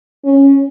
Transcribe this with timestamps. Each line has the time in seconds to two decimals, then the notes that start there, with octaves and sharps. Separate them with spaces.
0.25 C#4